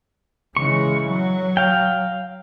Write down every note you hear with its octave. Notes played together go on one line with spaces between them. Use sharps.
C#3 E3 G#3 C#6
F#3
F5 G5